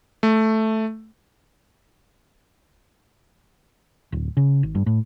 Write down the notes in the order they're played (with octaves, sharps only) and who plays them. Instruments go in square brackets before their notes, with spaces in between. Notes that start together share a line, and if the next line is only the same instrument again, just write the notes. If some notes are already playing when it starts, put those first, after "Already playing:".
[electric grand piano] A3
[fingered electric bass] D1
C#3
G#1
G2
A2